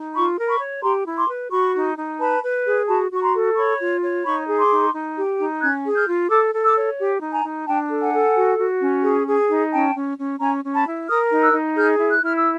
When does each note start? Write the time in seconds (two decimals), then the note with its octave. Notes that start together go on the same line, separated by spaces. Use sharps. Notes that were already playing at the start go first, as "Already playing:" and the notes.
Already playing: D#4
0.14 F4 B5 C#6
0.38 A#4
0.49 B5 C#6
0.60 C#5
0.83 G4 A#5 C6
1.05 E4
1.17 C6 D6
1.29 B4
1.51 F#4 B5 C#6
1.75 D#4
1.97 D#4
2.19 B4 A5 B5
2.43 B4
2.65 G#4
2.88 F#4 A5 B5
3.11 F#4
3.16 C#6
3.22 A#5 C6
3.34 A4
3.56 C#5 B5 C#6
3.79 F4
4.03 C#5
4.25 D#4 B5 C#6
4.47 G#4
4.59 C6 D6
4.71 D#4
4.94 D#4
5.17 G4
5.39 D#4
5.61 C#4 F#6 G#6
5.85 G#4
5.96 F6 G6
6.08 F4
6.30 A4 D6 E6
6.53 A4
6.64 D6 E6
6.76 C#5
6.99 G4
7.21 D#4
7.33 G#5 A#5
7.44 D#4
7.67 D4 G5 A5
7.90 A4
8.01 F#5 G#5
8.13 A4
8.35 F#4
8.59 F#4
8.81 C#4
9.03 G#4
9.26 G#4
9.50 D#4
9.72 C#4 G5 A5
9.94 C#4
10.17 C#4
10.40 C#4 G#5 A#5
10.63 C#4
10.74 A5 B5
10.86 E4
11.08 A#4 D#6 F6
11.31 D#4
11.43 E6 F#6
11.54 D#4
11.77 G#4 F6 G6
11.99 E4
12.11 F#6
12.23 E4 F6
12.37 E6